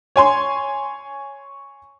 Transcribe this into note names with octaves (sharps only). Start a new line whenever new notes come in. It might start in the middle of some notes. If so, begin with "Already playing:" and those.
C#5 G#5 C6